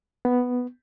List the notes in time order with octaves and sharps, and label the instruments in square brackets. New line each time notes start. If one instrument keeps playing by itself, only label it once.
[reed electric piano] B3